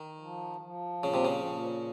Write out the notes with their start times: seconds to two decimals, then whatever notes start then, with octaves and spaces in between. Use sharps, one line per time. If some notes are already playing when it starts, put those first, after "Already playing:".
Already playing: D#3
0.19 F3
0.61 F3
1.03 A#2 C#3
1.14 C3
1.25 C#3
1.45 A#2